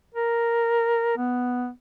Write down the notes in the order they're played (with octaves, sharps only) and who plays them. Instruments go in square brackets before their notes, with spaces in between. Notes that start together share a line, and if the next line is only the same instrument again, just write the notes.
[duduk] A#4
B3